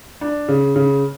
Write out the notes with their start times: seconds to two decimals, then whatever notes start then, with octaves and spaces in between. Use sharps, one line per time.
0.21 D4
0.48 C#3
0.76 C#3